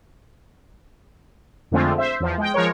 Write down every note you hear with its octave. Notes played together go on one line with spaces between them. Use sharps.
F2 D3 G#3 A3 C4 F4
C5 E5
E2 F3
G#3 G5
F3 G#3 A#4 C#5